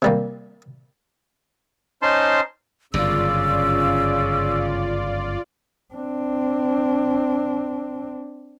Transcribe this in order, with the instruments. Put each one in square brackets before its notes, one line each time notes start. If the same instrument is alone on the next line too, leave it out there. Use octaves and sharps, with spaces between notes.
[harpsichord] C3 G3 A#3
[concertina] C#4 D#4 C5 A5 C6
[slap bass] G1 F#2 [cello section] C#3 [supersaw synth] F4 D5 [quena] E6
[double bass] C4 D4